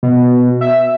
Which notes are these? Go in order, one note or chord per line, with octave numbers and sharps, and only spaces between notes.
B2
E5